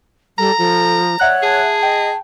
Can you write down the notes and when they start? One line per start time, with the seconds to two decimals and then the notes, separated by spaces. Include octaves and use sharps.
0.38 G3 A4 A#5
0.58 F3 A4
1.20 C#5 D5 E5 F#5 F#6
1.43 G#4 A5
1.83 D#5 G5